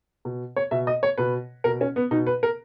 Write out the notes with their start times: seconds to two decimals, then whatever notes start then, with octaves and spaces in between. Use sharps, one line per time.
0.25 B2
0.56 C#5
0.71 B2 E5
0.87 D#5
1.03 C#5
1.18 B2 B4
1.64 B2 A#4
1.81 C#4
1.96 B3
2.11 B2 D#4
2.27 B4
2.43 A#4